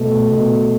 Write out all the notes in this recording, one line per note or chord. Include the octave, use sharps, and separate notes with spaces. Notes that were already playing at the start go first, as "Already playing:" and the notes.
Already playing: B2 A3
B2